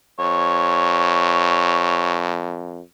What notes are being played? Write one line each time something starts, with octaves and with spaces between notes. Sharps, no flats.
F2 C#5